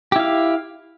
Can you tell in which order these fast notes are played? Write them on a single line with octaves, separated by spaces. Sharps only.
G4 E4 F5